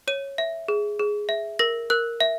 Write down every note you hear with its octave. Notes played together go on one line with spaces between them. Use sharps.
C#5 D#7
E5
G#4
G#4
E5
A#4 A#6
A#4 F#6
E5